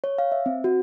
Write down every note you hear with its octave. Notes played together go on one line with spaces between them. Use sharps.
C#5
F5
E5
C4
F#4